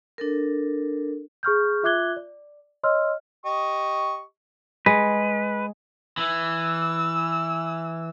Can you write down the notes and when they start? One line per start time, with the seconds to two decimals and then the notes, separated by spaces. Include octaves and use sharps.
0.18 D4 A4 A#4
1.43 G#4 C#6 F6 G6
1.83 F4 E5 D6 F#6 G#6 G7
2.17 D5
2.83 C#5 D#5 C6 E6 F6
3.45 G4 D#5 C#6
4.86 G#3 B4
6.17 E3 E6